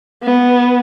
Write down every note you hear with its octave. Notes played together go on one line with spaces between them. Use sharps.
B3